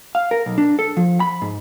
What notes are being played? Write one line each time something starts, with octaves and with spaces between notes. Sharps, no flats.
F5
A#4
B1
D4
A4
F3
B5
G#2